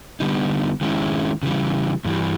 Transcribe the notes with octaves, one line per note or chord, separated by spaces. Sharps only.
D3 G3 B3 D#4
D#3 G#3 C#4 E4
C#3 E3 G3
G2 E3 G3